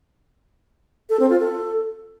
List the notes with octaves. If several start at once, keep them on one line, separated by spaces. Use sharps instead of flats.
A4
C4
F4
A4